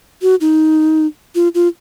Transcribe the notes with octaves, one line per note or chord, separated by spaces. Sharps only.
F#4
D#4
F4
F4